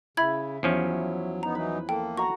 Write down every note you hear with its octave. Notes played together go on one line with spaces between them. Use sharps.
C#3 E4 E5 B5 G#6
E2 F3 F#3 C#4
B3 D#4 A#5
E3 F#3 D#4 B4
A#3 A4 G5
F#4 A#5 C#6